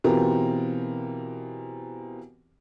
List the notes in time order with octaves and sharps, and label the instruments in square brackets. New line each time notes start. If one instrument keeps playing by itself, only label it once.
[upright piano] B2 E3 C4 F4 G4 A#4